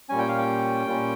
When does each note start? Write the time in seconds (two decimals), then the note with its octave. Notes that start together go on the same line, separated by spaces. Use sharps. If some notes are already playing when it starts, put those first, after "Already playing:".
0.09 A#2 G3 C#4 G#5
0.19 G5
0.28 F5
0.38 G5
0.87 A#2 G3 C#4